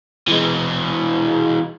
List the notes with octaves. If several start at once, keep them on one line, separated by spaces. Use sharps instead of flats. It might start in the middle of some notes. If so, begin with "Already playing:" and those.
E3 G#3